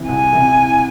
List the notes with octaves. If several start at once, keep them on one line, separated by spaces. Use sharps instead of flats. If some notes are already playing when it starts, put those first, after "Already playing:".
Already playing: C3 E3
C2 G#5
C3 E3